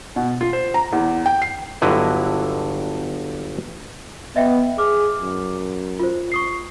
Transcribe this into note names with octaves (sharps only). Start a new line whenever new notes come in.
B2
F4
C5
A#5
E2
G5
C7
G1 G2 D3 F#3 E4 D#5
B3 D#5 E5 G5
G#4 D6 F6
F#2
F4 C5
C#6 D#6 C7